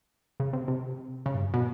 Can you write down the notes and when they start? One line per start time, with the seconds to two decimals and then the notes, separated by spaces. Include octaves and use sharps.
0.40 C#3
0.53 C3
0.68 C3
1.26 C#3
1.35 G2
1.44 F#2
1.54 B2